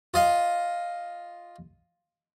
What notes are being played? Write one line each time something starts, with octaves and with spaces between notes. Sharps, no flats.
F4 D#5 F5